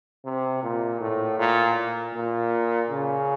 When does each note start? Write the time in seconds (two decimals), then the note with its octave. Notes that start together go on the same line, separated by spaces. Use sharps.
0.25 C3
0.63 A#2
1.00 A2
1.39 A#2
2.15 A#2
2.91 C#3